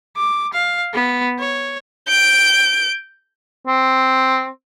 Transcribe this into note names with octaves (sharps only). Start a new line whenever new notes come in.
D6
F5
B3
C#5
G6 D7
C4